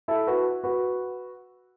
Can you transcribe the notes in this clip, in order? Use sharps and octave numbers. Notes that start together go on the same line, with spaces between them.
E4 A4
F#4 B4
F#4 B4